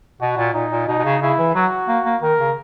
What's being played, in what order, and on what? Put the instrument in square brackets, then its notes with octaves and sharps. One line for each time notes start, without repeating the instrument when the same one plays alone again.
[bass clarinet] B2 [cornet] F#4
[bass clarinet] A#2
[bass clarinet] A#2 [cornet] D#4
[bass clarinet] A#2
[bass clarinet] B2 [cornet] D#4
[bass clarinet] B2
C#3
[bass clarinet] C#3 [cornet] E4
[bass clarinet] E3
[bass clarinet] F#3 [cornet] F#4
[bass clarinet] A#3
A#3
[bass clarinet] D#3 [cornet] A#4
[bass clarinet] C#3